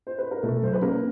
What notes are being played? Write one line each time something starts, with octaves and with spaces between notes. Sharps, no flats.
C5
B4
A#4
B2 A3 A4
F#3 C5
B4
A#3 C#4 A#4